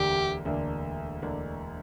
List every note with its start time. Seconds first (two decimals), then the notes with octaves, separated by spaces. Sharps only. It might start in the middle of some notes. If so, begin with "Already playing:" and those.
Already playing: E1 D2 D3 A#3 D4 G4
0.45 E1 D2 D3 A#3 D4
1.22 E1 D2 D3 A#3 D4